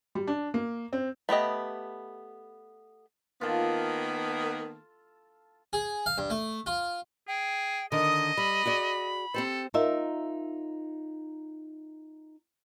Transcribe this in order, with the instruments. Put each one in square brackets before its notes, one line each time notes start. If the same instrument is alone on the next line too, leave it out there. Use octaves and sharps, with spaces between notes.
[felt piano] G3
D4
A#3
C4
[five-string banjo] A3 B3 G4 D#5
[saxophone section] D#3 A#3 B3 [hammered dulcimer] F4 A4
[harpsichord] G#4
F5
G2
A3
F4
[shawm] G#4 [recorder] G5
[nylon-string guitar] D3 D#3 [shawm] D#5 [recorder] D#6
[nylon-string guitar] G3 [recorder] B5
[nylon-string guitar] F#4 G#4 D5
[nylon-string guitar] C4 G4 C5 [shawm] A4
[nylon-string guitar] D#4 F4 A#4 E5